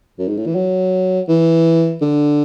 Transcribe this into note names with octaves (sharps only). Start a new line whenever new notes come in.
F#2
G#2
A2
E3
F#3
E3
D3